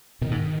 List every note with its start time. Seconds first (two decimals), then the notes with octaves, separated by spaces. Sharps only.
0.21 B2 D#3
0.31 G#2